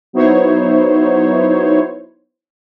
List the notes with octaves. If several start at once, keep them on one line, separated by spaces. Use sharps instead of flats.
F#3 B3 D#4 E4 C5 C#5